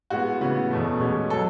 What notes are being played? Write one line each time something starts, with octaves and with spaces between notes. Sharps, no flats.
A2 G#3 B3 F#4
C#3 E3 B3
E2 B2 A3
B2 G#3 C#4
B2 F#3 A4